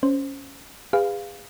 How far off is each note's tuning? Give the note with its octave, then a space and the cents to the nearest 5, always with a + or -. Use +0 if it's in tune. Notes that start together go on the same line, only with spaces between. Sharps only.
C#4 +0 C5 +0
G#4 -35 B4 +15 F5 +0